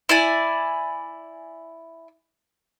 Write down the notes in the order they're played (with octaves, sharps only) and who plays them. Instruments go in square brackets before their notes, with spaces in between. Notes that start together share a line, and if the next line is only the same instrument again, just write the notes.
[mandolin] E4 D5 G#5